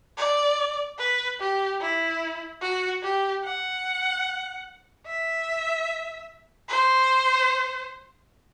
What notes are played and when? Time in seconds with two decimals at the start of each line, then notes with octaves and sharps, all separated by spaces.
0.17 D5
0.98 B4
1.40 G4
1.81 E4
2.61 F#4
3.03 G4
3.44 F#5
5.06 E5
6.69 C5